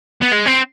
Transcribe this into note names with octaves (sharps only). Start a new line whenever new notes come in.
B3
G#3
C4